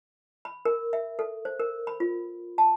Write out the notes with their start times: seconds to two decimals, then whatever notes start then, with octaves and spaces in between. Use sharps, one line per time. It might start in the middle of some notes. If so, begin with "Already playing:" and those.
0.45 B5
0.65 A#4
0.93 E5
1.19 A4
1.45 C5
1.60 A#4
1.87 B5
2.00 F4
2.58 A5